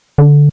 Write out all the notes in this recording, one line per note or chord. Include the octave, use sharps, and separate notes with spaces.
D3